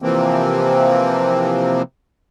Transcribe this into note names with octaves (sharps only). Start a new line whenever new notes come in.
C3 E3 F3 A#3 C4